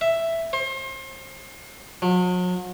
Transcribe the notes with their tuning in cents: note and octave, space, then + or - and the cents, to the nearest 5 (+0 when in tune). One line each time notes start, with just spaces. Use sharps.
E5 +5
C5 +35
F#3 -40